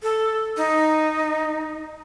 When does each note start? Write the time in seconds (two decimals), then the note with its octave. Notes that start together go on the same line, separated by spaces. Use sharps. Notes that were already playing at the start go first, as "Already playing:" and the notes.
0.03 A4
0.57 D#4